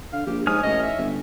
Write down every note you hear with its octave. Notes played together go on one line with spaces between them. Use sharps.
D3 F5
A#1 G4
G#2 C#5 G#5 D#6 F6
A1 D#5
E5
G1